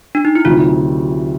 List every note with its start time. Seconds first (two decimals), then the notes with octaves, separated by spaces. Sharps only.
0.15 D4
0.25 D#4
0.35 E4
0.45 D2 C3 D#3 F#3 F4